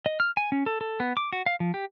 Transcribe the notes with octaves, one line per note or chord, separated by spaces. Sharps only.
D#5
F6
G#5
C#4
A4
A4
B3
D6
F#4
F5
F3
G4